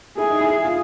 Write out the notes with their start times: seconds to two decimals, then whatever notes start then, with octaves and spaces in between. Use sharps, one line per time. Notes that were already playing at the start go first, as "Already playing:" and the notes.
0.18 E4 G#4
0.30 D#4
0.41 E4
0.65 F4